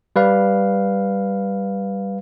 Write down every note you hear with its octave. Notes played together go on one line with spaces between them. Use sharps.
G3 B4 F5